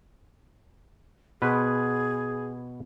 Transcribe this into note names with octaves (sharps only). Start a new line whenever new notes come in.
B2 G#4 B4 C5